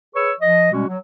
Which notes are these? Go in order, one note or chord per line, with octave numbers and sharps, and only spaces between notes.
G#4 B4 C#5 C#6 E6
F3 D#5
B2 G3 G#3 C#4 F#4
F#3